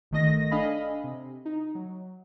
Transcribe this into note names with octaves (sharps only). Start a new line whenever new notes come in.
G1 D#3 A3 D#5 A#6
D4 A4 D#5 F5 G#5 B5
C3
D#4
F#3